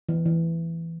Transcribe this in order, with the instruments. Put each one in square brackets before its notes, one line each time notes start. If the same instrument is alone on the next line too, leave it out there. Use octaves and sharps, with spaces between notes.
[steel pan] E3
E3